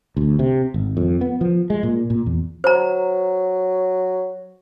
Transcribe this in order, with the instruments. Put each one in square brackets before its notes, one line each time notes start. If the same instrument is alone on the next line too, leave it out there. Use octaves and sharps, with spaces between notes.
[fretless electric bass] D2
C3
G#1
F2
B3
F3
G#3
A#2
A#2
E2
[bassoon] F#3 [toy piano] C5 A#5